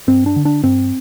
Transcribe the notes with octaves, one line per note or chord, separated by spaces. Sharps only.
G2 C4
D4
D3
D4
G2 C4